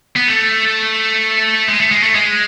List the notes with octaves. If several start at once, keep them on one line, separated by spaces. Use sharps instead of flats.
B3
A3
G#3
A3
G#3
A3
G#3